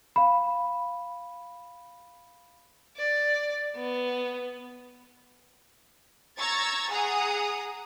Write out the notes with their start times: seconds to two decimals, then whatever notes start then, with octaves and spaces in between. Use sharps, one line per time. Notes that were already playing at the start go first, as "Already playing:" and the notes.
0.16 F5 B5
2.97 D5
3.76 B3
6.38 A#5 C#6 E6 G#6 A6
6.91 G#4 F#5 A#5 D#6